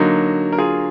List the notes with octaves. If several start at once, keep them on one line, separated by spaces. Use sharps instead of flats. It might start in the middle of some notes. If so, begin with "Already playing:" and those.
Already playing: D3 F#3 A#3 D#4 F#4
A#4
F4 G#4